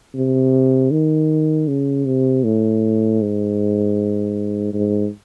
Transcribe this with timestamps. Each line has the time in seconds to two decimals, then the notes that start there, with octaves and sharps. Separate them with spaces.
0.15 C3
0.91 D#3
1.68 C#3
2.06 C3
2.44 A2
3.21 G#2
4.74 G#2